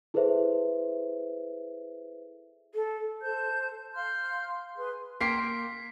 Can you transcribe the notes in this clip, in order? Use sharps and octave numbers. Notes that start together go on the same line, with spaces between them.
E4 G#4 A4 B4 C5 E5
A4
A4 C5 A5 G6
F5 C6 F6 G6
G#4 B4 C6
A#3 A#4 G5 C6 B6 C7